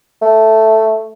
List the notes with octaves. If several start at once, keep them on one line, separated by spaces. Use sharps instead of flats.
A3